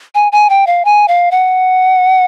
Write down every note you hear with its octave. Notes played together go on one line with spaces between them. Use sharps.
G#5
G#5
G5
F5
G#5
F5
F#5